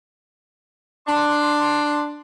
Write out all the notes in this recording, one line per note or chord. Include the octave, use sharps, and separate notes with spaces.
D4 C6